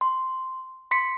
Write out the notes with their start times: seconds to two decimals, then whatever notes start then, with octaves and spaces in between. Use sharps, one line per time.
0.01 C6
0.91 C6 B6 C#7